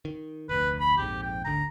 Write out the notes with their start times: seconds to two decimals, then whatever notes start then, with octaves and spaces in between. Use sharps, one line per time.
0.05 D#3
0.49 F1 D2 B4
0.80 B5
0.98 A#1 F2 G#2 G4
1.23 G5
1.45 G#1 D2 D3 A#5